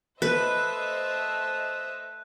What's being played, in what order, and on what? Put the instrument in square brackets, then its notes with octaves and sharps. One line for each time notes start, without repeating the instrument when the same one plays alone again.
[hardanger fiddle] A3 [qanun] B4 [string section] C5 D#5 E5 [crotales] F#6